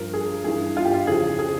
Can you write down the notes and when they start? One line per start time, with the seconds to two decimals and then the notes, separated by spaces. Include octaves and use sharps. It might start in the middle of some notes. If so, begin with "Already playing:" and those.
Already playing: G2 F3 A#4
0.14 G#4
0.44 G2 E3 G#4
0.77 F4
0.85 G4
0.94 F4
1.07 F2 C#3 E3 G#4
1.39 G#4